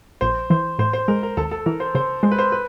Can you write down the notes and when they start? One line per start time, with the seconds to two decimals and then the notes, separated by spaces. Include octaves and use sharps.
0.21 A#1 C5
0.50 E3 C5
0.79 A2 C5
0.93 C5
1.08 G#3 A#4
1.23 A#4
1.37 D#2 A4
1.51 A4
1.66 E3 A#4
1.80 C5
1.95 C#3 C5
2.23 G#3 C5
2.31 B4
2.38 C5
2.52 B4